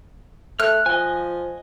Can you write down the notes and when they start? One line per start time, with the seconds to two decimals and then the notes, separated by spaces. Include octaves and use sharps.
0.60 A3 F6 F#6
0.86 F3 D#5 G#5